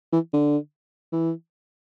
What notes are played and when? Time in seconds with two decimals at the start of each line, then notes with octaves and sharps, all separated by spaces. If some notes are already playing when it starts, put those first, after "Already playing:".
0.12 E3
0.33 D3
1.12 E3